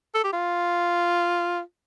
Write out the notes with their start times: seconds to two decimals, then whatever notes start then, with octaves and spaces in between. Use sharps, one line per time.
0.15 A4
0.24 G4
0.33 F4